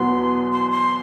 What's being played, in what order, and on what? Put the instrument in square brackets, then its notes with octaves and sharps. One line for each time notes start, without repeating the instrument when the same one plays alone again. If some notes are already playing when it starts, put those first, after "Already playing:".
Already playing: [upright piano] E2 B2 F#3 B3 [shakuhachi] C6
[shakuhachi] C6
C6